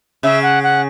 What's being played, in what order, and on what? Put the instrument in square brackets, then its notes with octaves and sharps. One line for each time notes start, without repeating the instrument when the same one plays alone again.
[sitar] C#3 [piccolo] E5
[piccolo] F#5
F#5